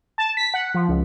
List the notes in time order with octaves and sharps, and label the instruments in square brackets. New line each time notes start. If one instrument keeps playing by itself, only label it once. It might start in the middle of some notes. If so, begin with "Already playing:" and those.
[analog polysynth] A5
B6
F#5
F3
C#2